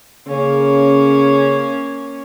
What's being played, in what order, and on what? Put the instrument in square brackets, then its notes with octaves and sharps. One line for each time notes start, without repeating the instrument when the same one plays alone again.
[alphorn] C#3 [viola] A#3 C#4